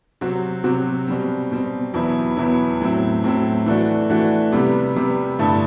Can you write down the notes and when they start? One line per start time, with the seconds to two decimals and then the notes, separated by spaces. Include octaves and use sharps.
0.21 C3 F#3 C4 F#4
0.64 C3 F#3 C4 F#4
1.08 B2 G3 C4
1.51 B2 G3 C4
1.94 E2 B2 F#3 B3 E4
2.37 E2 B2 F#3 B3 E4
2.81 A2 F#3 C4 E4
3.24 A2 F#3 C4 E4
3.66 E3 A3 D4 F#4
4.10 E3 A3 D4 F#4
4.52 C3 G3 B3
4.96 C3 G3 B3
5.39 G2 D3 A3 E4